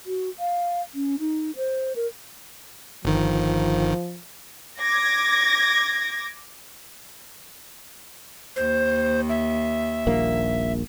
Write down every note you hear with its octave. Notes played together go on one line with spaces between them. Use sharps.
F#4
F5
C#4
D#4
C5
A#4
G1 D#3 F3
D6 G#6 A#6
D#2 C5
E5
D#1 A#1 A#3